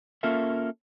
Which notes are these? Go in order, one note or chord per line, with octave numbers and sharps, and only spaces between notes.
A#3 C#4 F4 A4 A#4 E5